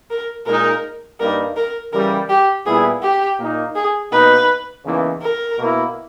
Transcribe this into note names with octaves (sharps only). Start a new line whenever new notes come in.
A#4
A#2 G#3 D#4 A#4
G2 G3 A#3 D#4 A#4
A#4
C#3 E3 G3 A#4
G4
A#2 G3 B3 E4 G#4
G4
A#2 A#3 D#4
G#4
B2 A#3 D#4 B4
E2 C#3 E3 A#3 D#4
A#4
B2 A#3 E4